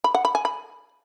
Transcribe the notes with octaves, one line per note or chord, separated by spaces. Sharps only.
B5
F#5
B5
G#5
B5